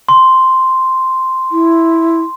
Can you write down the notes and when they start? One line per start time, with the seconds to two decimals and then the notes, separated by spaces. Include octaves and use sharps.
0.09 C6
1.52 E4